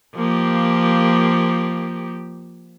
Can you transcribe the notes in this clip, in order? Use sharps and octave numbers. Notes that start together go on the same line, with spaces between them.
F3 A#3 G4